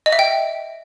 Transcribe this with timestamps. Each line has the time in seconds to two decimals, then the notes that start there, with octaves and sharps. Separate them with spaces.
0.06 D#5
0.12 E5
0.19 G5